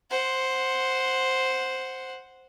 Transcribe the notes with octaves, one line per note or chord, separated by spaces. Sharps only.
C5 F#5